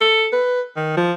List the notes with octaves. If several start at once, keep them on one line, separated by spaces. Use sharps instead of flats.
A4
B4
D#3
F3